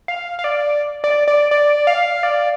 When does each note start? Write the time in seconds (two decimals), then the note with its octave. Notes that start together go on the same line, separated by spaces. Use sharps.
0.08 F5
0.39 F5
0.44 D5
1.04 D5
1.28 D5
1.51 D5
1.87 F5
2.23 D5